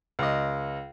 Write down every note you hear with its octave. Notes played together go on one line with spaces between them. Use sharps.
C#2 D#5